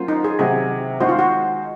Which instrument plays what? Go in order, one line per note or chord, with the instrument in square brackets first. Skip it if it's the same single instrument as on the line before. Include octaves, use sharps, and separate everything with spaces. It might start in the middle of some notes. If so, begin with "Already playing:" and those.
Already playing: [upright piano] F#3 A#3 C#4 F4 C5
[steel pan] D#4
G#4
[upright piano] C3 D#3 F#3 [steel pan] G#4
[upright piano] D#3 G#3 D#4 G#4 C5 [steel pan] F#4
[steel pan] F4
F#4